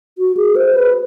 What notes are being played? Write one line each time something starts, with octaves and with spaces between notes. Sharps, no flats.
F#4
G#4
C5
B4